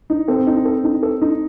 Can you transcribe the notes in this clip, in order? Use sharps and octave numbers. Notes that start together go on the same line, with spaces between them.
D#4
C4 A4
D#4
A4
D#4
A4
D#4